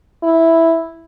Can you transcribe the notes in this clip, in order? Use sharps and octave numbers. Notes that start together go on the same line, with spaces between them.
E4